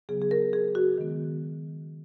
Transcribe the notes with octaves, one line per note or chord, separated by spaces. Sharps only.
C#3 F#3 B3 G#4
G#4
A#4
G#4
F#4
D#3 G#3 B3